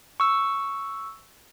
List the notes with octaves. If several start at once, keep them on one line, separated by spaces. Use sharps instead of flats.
C#6 E6